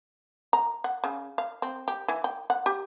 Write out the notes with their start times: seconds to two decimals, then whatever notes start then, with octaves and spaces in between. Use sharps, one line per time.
0.53 A#5
0.84 F#5
1.04 C#3
1.38 F5
1.62 C4
1.88 G4
2.08 E3
2.24 G5
2.50 F#5
2.66 G4